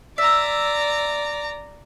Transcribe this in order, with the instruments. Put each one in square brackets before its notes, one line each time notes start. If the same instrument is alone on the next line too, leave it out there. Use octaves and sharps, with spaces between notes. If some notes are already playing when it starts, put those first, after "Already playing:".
[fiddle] D5 A#5 [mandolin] E5